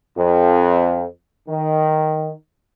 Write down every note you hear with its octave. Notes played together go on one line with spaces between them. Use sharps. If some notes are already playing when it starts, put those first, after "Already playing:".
F2
D#3